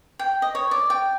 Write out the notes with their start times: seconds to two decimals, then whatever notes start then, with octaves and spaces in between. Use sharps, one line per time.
0.19 G5
0.42 D#5
0.55 C#5
0.71 D5
0.90 G5